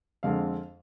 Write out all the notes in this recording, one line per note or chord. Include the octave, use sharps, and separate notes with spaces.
F2 D3 G#3 C4 F5